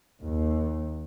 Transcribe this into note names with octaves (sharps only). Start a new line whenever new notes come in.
D#2